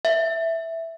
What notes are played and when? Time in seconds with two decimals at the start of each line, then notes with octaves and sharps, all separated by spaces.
0.05 E5